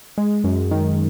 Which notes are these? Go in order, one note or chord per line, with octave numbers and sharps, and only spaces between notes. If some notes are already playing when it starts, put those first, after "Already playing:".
G#3
F#2
D#3